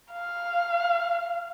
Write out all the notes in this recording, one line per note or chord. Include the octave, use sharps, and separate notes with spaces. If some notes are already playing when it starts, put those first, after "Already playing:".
F5